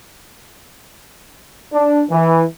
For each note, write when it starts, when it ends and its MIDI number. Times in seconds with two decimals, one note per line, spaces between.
1.73 2.03 62
2.10 2.44 52